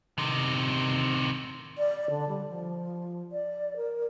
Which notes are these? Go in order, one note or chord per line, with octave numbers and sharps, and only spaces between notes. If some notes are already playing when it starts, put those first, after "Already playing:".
C3 D#3
D5
D3
G3
F3
D5
A#4